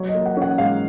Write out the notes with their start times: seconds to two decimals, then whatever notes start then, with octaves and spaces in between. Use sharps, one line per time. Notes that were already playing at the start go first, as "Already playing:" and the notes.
Already playing: F#3 C#5
0.08 D#5
0.14 A#3
0.25 F#5
0.37 C#4 F#5
0.58 G#2 F5